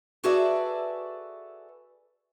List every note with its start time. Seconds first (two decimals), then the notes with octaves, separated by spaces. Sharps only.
0.24 F#4 G#4 A4 B4 D5 E5